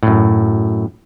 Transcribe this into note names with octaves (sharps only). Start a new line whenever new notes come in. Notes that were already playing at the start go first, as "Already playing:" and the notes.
F#2 A2